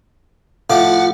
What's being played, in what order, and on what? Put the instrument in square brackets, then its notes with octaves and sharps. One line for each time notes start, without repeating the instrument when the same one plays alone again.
[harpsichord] A2 F3 D6 [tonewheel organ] F4 [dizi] F#5